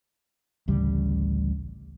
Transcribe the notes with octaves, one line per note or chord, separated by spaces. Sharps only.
A1 D2 C#3 G3